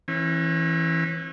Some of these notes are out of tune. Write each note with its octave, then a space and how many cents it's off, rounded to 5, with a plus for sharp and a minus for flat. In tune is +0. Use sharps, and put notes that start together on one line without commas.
E3 +0 C#4 -40